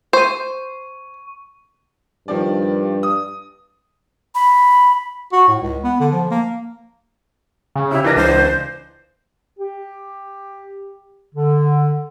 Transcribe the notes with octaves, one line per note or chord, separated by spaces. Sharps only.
C5 C#6 D#7
G2 D#3 F3 D5
D#6
B5
F#4
A2
C#2
B3
D3
F3
A#3
C#3
C3 E4 G4
E3 D4 A#4 A#6
C#2 C5
G4
D3